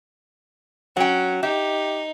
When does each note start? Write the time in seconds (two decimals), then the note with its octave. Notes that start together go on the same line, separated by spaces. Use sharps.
0.97 F#3 C#4 F#5 G5
1.43 D#4 G4 E5